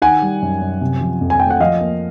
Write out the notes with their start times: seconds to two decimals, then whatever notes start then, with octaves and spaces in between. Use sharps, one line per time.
0.02 D#3 F#5 G#5
0.22 G3
0.42 F#2
0.62 F#2
0.81 C3
1.01 F3
1.21 F2
1.30 G#5
1.40 A3 G5
1.50 F#5
1.60 F3 D#5 F5
1.81 A#3